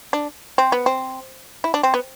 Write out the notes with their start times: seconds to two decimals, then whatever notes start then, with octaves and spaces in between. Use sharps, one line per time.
0.13 D4
0.58 C4
0.72 B3
0.86 C4
1.64 E4
1.74 D4
1.83 C4
1.94 B3